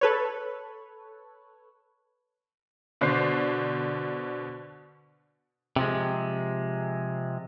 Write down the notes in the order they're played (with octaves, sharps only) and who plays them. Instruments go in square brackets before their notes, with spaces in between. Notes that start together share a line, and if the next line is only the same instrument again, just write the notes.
[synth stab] A4 B4 C#5
[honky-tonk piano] B2 D3 C5 F#6 C7
[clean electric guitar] C3 F3 G#3